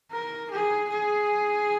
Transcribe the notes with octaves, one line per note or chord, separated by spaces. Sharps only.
A#4
G#4
G#4